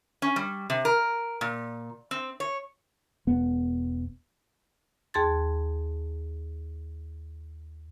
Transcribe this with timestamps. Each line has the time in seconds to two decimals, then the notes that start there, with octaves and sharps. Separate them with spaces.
0.22 C#4
0.36 G3
0.70 C3
0.85 A#4
1.41 A#2
2.11 C4
2.40 C#5
3.27 E1 B3
5.14 D#2 G#4 A5 C6 A6